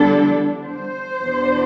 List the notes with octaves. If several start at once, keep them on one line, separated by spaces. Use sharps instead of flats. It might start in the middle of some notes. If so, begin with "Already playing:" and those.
Already playing: E2 D3 G3 D4 A4
C5
E2 B2 B3 D4